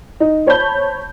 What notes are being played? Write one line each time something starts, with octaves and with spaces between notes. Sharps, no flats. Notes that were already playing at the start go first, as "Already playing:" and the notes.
D#4
C5 C#5 A5 B5 G6